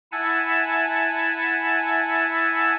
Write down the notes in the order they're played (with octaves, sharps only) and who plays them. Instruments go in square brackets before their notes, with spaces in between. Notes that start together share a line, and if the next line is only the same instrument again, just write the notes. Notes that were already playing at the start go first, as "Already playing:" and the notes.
[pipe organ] E4 E5 F#5 G#5 A5 E6